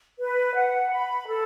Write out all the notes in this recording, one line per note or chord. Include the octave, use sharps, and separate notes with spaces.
B4
F#5
B5
A4